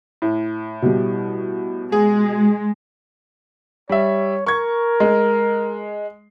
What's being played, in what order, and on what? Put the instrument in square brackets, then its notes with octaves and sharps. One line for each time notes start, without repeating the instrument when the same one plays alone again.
[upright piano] A2
[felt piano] B2 G3
[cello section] G#3 [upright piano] G#4
[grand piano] G3 E5 [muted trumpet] C#5
[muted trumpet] A#4 [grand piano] C#6 G#6
[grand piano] G#3